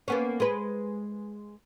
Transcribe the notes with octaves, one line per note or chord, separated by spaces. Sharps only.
A#3 B3 C#4
G#3 B4